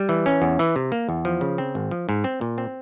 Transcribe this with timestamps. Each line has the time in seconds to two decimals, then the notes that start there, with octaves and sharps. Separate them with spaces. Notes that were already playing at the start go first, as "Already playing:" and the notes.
Already playing: G3
0.09 E3
0.26 C#4
0.42 E2
0.59 E3
0.76 C3
0.92 A#3
1.09 E2
1.25 F3
1.41 C#3
1.58 C4
1.75 G#1
1.91 F3
2.09 G#2
2.24 C4
2.41 A#2
2.58 C4